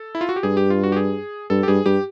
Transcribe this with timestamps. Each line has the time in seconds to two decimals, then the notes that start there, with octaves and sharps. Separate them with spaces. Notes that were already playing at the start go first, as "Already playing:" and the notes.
Already playing: A4
0.15 E4
0.21 F4
0.29 F#4
0.36 G4
0.43 G2 G#4
0.57 G4
0.70 F4
0.83 F#4
0.92 G4
0.96 G#4
1.50 G2 A4
1.63 G4
1.68 G2 G#4
1.85 G2 G4